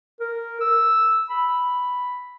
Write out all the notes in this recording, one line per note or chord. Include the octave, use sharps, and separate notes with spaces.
A#4
E6
B5